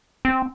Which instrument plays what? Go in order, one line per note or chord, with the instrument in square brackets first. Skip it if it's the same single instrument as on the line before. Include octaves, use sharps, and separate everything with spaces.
[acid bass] C4